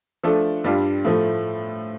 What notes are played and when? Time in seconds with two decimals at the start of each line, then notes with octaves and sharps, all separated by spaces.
0.23 F3 A3 D4 A4
0.64 G2 G3 D4 F4
1.05 A2 F3 A3